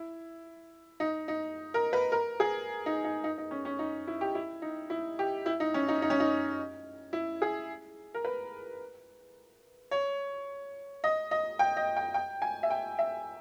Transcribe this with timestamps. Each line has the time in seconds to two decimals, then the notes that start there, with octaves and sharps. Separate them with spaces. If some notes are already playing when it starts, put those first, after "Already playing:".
Already playing: E4
1.00 D#4
1.28 D#4
1.74 A#4
1.93 B4
2.12 A#4
2.40 G#4
2.86 D#4
3.04 D#4
3.24 D#4
3.38 D#4
3.51 C#4
3.65 C#4
3.79 D#4
4.07 E4
4.21 G4
4.35 E4
4.62 D#4
4.90 E4
5.19 G4
5.46 E4
5.60 D#4
5.74 C#4
5.89 D#4
6.02 D#4
6.10 C#4
6.20 D#4
7.13 E4
7.42 G#4
8.14 A#4
8.25 B4
9.91 C#5
11.04 D#5
11.31 D#5
11.59 G5
11.77 D#5
11.97 G5
12.14 G5
12.42 G#5
12.63 E5
12.70 G5
12.99 E5